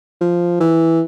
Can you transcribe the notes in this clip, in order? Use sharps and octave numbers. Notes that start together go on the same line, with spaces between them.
F3
E3